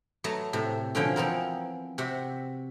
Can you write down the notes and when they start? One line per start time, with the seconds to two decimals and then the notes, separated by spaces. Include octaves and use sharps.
0.24 F#3 A3 B3 A5 A#5
0.53 A2 C3
0.95 B2 D3 F3 C#4 E4 G5
1.16 E3 F3 B3 C4 A#4
1.98 C3 F#4 E5